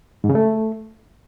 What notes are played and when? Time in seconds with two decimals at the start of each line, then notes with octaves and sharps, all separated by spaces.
0.24 G#2
0.29 C#3
0.35 A3